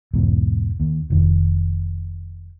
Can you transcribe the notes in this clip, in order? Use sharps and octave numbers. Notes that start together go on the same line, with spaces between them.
B1 E2 G#2
D#2
F1 D#3